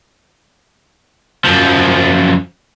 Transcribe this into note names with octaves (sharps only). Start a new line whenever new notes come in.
F#2 F3